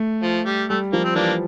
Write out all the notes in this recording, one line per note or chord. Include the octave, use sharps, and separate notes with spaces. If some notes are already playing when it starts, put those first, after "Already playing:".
Already playing: A3
F3
G3
G3 A3
F3 A#3
C4
E3 A#3 D4